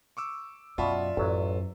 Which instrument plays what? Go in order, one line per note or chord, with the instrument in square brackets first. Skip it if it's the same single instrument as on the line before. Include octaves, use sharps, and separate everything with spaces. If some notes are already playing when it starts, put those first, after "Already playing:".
[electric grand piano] C#6 D6 E6
[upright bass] F#2 [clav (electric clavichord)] B2 [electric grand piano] F4 E5 [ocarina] D5
[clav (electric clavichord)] A1 F#3 [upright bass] F#2